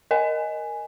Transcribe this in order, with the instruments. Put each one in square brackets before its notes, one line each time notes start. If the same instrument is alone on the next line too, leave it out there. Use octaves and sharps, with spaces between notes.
[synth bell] A#4 D#5 G#5